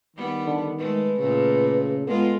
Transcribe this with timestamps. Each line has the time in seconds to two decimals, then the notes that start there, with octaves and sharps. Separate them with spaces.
0.17 D#3 G3 B3
0.46 D3
0.78 G#3 A3 B4
1.18 A#2 C#3 A3
2.07 G#3 B3 F4 A4